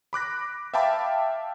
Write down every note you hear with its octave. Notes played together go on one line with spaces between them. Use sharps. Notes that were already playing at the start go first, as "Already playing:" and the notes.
B5 D6 F#6 A#6
E5 F5 G5 A5 B5 D6